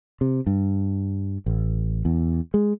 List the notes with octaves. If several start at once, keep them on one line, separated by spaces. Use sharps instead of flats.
C3
G2
A1
E2
G#3